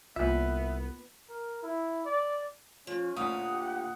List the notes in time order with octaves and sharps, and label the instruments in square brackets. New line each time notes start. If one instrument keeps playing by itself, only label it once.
[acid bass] C2 [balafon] A#3 F4 [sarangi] B3 [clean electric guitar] E5
[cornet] A#4
E4
D5
[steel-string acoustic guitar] F3 [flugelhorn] C#4
[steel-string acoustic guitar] D2 A#2 F5 [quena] F#5 [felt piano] D#6
[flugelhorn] G4